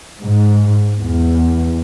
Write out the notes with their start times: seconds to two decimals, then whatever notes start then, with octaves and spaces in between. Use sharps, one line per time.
0.22 G#2
1.01 E2